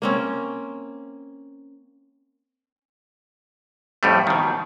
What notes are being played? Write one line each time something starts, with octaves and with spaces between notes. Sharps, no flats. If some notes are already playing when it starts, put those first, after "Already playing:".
A#3 C4 C#4
F2 A2 G3 A3
B2 D#3